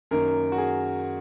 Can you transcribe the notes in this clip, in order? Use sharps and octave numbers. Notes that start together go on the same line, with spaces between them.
F#2 D#3 A#3 A#4
F#4
G#4